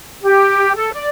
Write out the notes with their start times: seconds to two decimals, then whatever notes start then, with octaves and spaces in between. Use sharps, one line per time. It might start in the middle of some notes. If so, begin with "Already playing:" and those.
0.22 G4
0.75 A4
0.93 D5